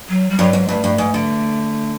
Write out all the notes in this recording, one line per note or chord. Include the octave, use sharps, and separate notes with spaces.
F#3
G3
G2 F#3
G#2
G2 A3
G2
G#2
D3